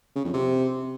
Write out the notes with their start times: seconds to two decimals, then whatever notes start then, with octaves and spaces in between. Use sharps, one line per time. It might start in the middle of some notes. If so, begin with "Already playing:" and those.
0.16 C#3
0.25 F2
0.34 C3